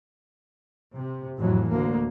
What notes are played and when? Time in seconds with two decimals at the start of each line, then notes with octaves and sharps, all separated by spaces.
0.94 C3
1.37 F2 A2 E3 F#3
1.68 D2 A#3